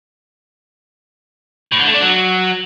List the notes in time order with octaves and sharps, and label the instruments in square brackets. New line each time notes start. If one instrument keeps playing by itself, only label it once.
[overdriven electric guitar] A2
D3
A3
D4
F#3